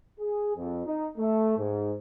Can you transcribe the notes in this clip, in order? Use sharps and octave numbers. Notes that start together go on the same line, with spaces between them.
G#4
F2
D#4
A3
G#2